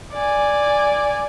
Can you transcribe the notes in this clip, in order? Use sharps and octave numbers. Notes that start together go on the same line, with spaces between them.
D5 G#5